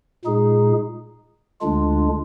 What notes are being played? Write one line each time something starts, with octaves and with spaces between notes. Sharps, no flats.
A#2 G#3 D#4 G#4
D2 D3 G#3 D4 F4